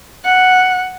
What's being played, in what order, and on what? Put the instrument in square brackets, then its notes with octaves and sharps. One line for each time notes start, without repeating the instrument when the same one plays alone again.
[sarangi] F#5